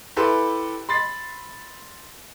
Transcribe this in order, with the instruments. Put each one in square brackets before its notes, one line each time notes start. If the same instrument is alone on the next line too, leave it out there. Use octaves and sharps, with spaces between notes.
[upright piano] E4 G4 A4 B4 C6
B5 C6 A6 C7